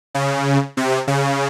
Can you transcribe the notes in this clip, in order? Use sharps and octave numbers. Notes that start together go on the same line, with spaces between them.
C#3
C3
C#3